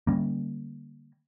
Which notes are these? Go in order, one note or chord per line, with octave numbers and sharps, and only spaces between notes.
D3 G3 A#3 C#4